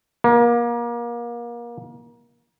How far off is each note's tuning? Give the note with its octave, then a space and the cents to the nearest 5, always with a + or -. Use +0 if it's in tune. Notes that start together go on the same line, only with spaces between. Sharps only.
A#3 +30